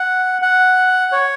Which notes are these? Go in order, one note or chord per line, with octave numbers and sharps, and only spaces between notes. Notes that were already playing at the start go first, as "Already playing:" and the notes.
Already playing: F#5
F#5
C#5